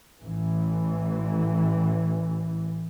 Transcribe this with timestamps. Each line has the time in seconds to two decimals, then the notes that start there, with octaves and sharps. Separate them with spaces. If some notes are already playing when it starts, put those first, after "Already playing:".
0.22 A1 E3